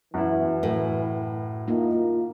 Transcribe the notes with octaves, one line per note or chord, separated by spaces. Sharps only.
F#2 E3 E4
A2
A#3 D#4 F4